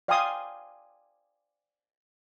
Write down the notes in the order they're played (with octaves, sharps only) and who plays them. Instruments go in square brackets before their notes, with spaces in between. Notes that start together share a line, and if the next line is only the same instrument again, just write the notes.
[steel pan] D5 F5 G5 G#5 C6 D#6